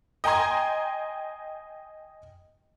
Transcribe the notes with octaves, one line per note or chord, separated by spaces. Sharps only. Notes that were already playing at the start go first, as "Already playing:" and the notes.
D#5 G5 G#5 A#5 C6 G#6